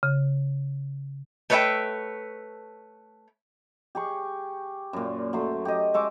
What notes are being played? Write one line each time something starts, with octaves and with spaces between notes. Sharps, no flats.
C#3
A3 B4 C#5 D5 E5 G5
G4 G#4 C#6
F#2 A#2
F#3 A3 C5
G4 D#5
G#3 E5 C#6 D6